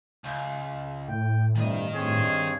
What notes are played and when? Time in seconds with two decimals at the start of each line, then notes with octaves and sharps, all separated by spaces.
0.25 C#2
1.08 A2 G5
1.55 G2 C3 D#3 G3 D#5
1.94 G2 C4 G#4 C#5